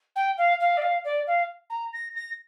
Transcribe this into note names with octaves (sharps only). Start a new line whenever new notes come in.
G5
F5
F5
D5
F5
D5
F5
A#5
A#6
A#6